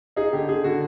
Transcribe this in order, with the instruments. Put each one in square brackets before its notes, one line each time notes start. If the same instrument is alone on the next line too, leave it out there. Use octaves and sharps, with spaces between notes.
[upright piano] D#4 [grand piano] G#4
[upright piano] D3 [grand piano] G4
[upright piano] D3 [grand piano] G#4
[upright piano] D3 [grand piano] F#4